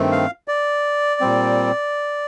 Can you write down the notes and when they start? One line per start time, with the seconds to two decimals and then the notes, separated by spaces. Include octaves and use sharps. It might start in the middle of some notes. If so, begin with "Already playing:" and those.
Already playing: G2 D#3 A3 C4
0.12 F5
0.48 D5
1.21 A#2 G3 C4